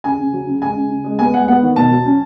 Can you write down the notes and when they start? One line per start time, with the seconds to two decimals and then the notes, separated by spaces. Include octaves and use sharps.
0.04 C#3 G#5
0.19 C#3
0.33 F#3
0.47 C#3
0.62 G#3 G#5
0.76 C#3
0.90 C#3
1.04 G#3
1.19 B3 G#5
1.34 G#3 F#5
1.48 B3 F#5
1.62 D#3
1.76 B2 A5
1.91 F#3
2.06 C#4